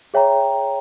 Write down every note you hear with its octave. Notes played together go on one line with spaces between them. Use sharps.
G#4 C#5 E5 G5 A#5